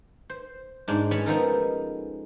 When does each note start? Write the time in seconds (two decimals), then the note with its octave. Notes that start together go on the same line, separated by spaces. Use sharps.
0.30 C5
0.88 G#2 G#3 D4
1.11 C#4 C#5 D#5 G#5 A5 B5
1.26 F3 G#3 B3 D#4 A4 A#4